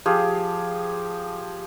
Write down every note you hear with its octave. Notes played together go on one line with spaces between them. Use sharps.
F3 G4 G#4